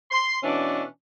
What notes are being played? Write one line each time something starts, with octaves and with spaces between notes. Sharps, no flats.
C6
B2 E3 C#4 D4